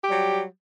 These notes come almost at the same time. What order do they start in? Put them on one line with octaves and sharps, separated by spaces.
G4 G3 F#3